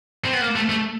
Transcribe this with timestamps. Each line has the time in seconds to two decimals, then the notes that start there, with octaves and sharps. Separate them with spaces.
0.24 C4
0.33 B3
0.41 A#3
0.56 A3
0.69 A3